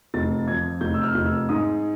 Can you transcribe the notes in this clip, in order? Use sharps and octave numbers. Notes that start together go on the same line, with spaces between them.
F1 A6
F2 G#6
F1 G6
E6
F6
F1
E6
G#2 D#6